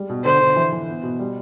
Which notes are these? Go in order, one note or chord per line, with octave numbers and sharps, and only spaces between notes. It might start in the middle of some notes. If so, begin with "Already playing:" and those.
Already playing: G3 G#3
B2
D3 C5
D3
E3
E3
B3
B2
G3